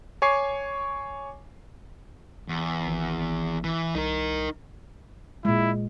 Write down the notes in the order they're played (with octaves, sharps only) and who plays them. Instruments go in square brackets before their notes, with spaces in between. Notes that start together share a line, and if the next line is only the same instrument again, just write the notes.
[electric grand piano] C#5 G#5 C#6 D6 C7
[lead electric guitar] E2
[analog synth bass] G#1
[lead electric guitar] E3
[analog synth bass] C2 [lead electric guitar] D#4 A#4
[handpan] A#2 G#3 [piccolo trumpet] E4